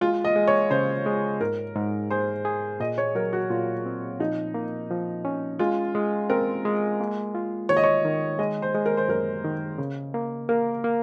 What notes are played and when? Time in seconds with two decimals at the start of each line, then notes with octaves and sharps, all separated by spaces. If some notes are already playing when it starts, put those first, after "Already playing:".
0.01 G#3 F4
0.25 D#5
0.36 G#3
0.48 C#5
0.71 C#3 C5
1.06 G#3
1.41 G#2 A#4
1.76 G#2
2.11 G#4 C5
2.45 G#4
2.80 A#2 D#5
2.98 C#5
3.15 F#3 A#4
3.33 F#4
3.50 A#2 F4
3.86 C4
4.20 F3 D#4
4.54 A#3
4.90 F3
5.25 C#4
5.59 G#3 F4
5.95 G#3
6.30 C4 A#4
6.65 G#3
7.00 A#3
7.34 F4
7.69 D#3 C#5
7.77 D#5
7.84 C#5
8.05 D#3
8.39 G#3 D#5
8.62 C5
8.75 G#3
8.86 A#4
8.97 C5
9.08 F#2 A#4
9.44 D#3
9.78 C#3
10.14 A#3
10.49 A#3 A#4
10.84 A#3